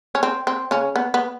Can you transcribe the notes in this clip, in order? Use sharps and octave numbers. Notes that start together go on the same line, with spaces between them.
C#4
C4
C4
C#3 C#4
B3
B3